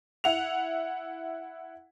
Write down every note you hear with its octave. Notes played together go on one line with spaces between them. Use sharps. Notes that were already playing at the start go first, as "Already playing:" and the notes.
E4 F#5 F7